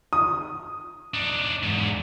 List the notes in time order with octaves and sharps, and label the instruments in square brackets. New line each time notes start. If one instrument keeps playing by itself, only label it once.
[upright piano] D#6
[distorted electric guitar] D4 D#4
E2 G#2